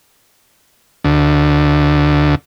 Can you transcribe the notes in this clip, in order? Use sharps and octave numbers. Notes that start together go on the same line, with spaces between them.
D2